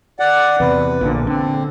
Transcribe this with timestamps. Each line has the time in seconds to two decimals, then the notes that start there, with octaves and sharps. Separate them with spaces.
0.20 D5 F#5
0.60 E2 C3 B4
1.01 A#1 A#2 D3
1.27 D3 C4